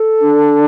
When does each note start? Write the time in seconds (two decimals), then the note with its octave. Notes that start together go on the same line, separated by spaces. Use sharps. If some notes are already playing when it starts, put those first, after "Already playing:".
Already playing: A4
0.20 D4